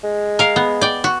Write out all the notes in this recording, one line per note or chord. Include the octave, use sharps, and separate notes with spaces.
G#3
A#4 F5
B3
D5 G5
F#4